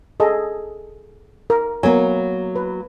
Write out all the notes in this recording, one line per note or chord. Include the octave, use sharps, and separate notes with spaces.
G#4 A4 D#5
A#4
F#3 A#3 B3 A#4 G#5
B4